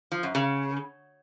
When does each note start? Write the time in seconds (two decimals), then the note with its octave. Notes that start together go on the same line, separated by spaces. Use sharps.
0.12 F3
0.23 F#2
0.35 C#3